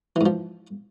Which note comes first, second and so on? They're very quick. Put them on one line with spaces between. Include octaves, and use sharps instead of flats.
E3 G#2 F3